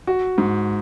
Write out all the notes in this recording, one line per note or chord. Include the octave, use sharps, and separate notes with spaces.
F#4
G#2